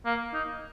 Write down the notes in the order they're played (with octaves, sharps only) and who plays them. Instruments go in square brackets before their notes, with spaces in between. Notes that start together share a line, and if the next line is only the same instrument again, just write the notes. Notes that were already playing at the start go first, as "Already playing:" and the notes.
[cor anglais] A#3
D#4